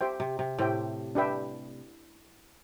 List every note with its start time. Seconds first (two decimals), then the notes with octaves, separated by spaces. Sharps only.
0.01 G4 C5 E5 G5
0.20 C3
0.39 C3
0.59 A2 G4 C5 E5 G5
1.15 D4 G4 B4 E5 G5